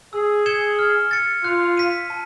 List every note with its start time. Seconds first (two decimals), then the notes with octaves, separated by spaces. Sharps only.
0.13 G#4 E6
0.46 G#6 C#7 E7 G7
0.79 F6
1.11 A6 C#7
1.44 F4 F#6
1.77 B6 D#7
2.10 A5